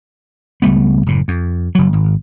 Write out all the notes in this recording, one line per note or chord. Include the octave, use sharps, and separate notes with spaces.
C#2 G3 A3 B3
F#1 A2
F2
F#1 F#3
G#1